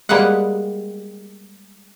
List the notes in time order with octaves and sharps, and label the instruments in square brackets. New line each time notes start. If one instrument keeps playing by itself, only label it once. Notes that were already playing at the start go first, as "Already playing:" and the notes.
[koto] G3 G#3 A#3 B3 G#4 F#5